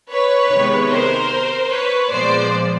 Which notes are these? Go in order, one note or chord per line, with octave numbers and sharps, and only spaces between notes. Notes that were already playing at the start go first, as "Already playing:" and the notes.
B4 C#5
C3 D#3 G#3 B3
A#4 C5
B4 C#5
A#2 F3 G#3 B3 C5 D5